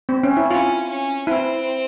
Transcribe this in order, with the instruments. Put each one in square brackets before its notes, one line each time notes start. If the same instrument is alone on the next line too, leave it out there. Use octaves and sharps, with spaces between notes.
[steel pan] C4
C#4
E4
[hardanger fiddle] C#4 [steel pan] F4
[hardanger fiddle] C#4
[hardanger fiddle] C4 [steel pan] E4